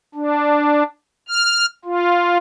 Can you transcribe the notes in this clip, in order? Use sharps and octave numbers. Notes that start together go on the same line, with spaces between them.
D4
F6
F4